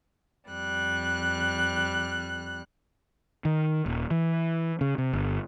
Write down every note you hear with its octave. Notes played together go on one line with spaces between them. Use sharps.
F2 G3 F#6
D#3
D#1
E3
C#3
C3
G1